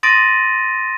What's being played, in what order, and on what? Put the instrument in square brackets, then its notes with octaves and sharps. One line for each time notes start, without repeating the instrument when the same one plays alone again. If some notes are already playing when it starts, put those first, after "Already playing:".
[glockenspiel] C6 D#6 A6 A#6 D7 D#7